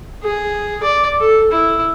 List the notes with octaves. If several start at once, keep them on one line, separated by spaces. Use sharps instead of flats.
G#4
D5
A4
E4